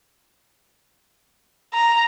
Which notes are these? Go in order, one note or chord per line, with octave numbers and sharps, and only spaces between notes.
A#5